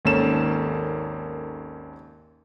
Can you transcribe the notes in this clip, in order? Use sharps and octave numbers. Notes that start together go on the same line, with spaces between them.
G#1 D#2 A#3 C#4 A4 E7